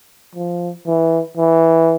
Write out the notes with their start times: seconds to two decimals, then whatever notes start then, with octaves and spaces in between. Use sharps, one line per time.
0.35 F3
0.86 E3
1.37 E3